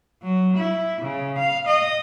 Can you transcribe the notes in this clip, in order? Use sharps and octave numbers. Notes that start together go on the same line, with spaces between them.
F#3
E4
C#3
F5
D#5